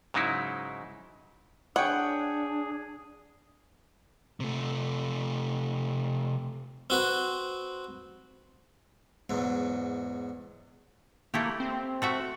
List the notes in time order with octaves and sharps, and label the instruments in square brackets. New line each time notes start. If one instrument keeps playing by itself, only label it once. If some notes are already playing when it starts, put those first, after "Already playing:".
[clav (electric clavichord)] G#2 C#3 F#3 D#4 E4
[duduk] D4 [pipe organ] G#4 [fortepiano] C#5 G5 [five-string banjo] F#5
[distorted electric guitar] C3 A3
[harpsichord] C4 F#4 B4
E2 G#2 F#3
[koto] A3 E4 G4 [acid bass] A#3
[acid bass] C4
[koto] A3 F#4 E5